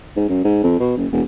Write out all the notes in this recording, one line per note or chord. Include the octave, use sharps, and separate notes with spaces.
G#2
F#2
G#2
F2
B2
F#1
E1